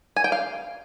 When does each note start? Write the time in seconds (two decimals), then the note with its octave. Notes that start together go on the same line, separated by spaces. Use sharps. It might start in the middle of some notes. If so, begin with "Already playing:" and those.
0.16 G#5
0.24 G5
0.32 F5